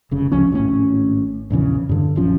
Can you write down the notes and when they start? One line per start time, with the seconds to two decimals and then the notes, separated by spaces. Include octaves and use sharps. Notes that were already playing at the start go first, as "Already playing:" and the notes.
0.11 F1 C#3
0.32 C#2 F3 C#4
0.52 G#1 A2 C#4
1.50 A#1 E2 C#3 E3
1.89 G2 D3
2.16 D#1 F#2 F3 C#4